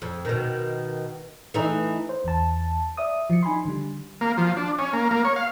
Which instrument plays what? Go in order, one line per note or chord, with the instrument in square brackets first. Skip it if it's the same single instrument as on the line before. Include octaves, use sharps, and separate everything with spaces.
[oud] F2
B2 D#3
E3 A3 D#4
[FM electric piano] C5
E2 A5
D5 E5 D#6
F3 C#7
D#4 G#5 B5 C6
D3 G3
[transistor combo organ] A#3
F3
D4
C#4
A#3
A#3
C#5
F5